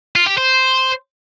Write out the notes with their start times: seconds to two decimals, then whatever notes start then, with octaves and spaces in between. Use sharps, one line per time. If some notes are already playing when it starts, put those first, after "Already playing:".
0.15 F4
0.26 G4
0.37 C5